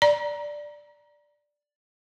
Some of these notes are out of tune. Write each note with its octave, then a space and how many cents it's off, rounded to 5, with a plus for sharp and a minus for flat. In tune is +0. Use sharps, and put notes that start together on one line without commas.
D5 +0 A#5 +20